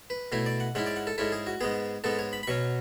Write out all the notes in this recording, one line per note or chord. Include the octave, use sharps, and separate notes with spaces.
B4
B2 A3 E4 C#5
D5
F#5
G#2 G#3 C#4 E4 F#5
D5
F#5
A4
G#2 G#3 C#4 E4 A4
G#4
F#4
G#2 G#3 B3 G#4
G#2 G#3 B3 A4
C#5
B5
B5
B2 F#3 C#4 C#6